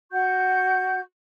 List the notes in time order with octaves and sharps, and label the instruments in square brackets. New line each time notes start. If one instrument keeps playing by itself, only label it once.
[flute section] F#4 F#5 C#6 G6